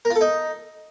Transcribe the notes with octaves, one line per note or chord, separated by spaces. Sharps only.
A#4
F4
A4
D#4